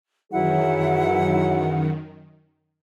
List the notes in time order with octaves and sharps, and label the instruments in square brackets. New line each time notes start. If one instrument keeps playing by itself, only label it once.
[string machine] F#2 D#3 [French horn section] E3 F#3 G#4 [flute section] E4 F#5